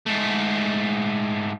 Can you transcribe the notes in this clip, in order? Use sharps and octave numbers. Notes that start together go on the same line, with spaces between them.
G#2 A3